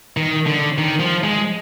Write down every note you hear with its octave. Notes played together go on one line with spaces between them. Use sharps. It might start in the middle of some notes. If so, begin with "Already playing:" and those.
D#3
D3
D#3
F3
G#3